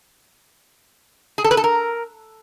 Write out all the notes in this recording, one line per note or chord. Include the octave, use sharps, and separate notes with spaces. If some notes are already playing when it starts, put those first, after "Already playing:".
G#4
A4
B4
A4
A#4